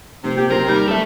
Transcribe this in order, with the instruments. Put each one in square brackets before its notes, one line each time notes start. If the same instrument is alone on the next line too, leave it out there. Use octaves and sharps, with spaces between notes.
[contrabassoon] F1 [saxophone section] C3
[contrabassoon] A#2 [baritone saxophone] G4
[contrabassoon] F#1 [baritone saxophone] C4 [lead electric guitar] A#4
[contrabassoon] D#2 [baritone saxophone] G3
[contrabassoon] F#1 [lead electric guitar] A4 E5